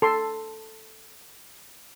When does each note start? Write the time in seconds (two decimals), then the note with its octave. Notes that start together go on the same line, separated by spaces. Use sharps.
0.02 A4 C6